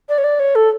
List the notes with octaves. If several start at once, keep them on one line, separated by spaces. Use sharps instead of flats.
D5
C#5
D5
C#5
A4